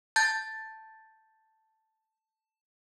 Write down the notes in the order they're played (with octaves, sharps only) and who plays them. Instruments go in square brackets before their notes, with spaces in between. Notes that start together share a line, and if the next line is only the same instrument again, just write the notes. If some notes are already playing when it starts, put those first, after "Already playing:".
[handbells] A5 G6 A6